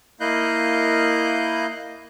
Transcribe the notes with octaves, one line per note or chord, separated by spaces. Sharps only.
A#3 E4 D#5 F5 F#6 G6